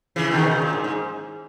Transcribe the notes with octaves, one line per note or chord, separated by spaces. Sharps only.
C#3 E3
B2 D#3
C#3
A#2
G#2
G#2